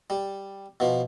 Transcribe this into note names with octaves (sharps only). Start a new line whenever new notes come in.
G3
B2 F3